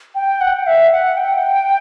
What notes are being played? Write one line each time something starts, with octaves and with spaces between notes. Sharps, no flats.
G5
F#5
E5
F#5
G5